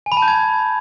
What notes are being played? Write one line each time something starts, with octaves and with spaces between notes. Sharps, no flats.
G#5
B5
A5
G6
G#6